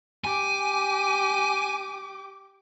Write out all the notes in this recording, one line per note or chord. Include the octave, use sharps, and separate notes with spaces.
G4 G#5 D6